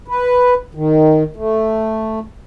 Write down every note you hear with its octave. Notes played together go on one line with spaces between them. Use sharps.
B4
D#3
A3